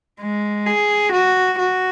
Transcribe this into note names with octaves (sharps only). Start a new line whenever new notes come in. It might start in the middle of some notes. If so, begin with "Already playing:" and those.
G#3
G#4
F#4
F#4